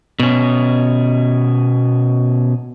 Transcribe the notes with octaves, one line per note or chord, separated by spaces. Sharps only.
B2 C#4